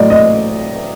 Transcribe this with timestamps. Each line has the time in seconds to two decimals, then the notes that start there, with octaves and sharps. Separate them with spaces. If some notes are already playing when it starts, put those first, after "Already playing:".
Already playing: A2 F#3 D5 D#5
0.10 D#5